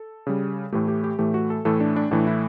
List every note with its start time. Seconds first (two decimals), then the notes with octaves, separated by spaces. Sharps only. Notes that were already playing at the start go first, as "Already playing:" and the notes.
Already playing: A4
0.27 C#3 G3
0.72 A2 E3 A3 G4
0.88 G4
1.04 G4
1.19 A2 E3 A3 G4
1.34 F#4
1.50 A4
1.65 A2 E3 A3 A4
1.80 D4
1.96 D4
2.11 A2 E3 A3 D4
2.27 E4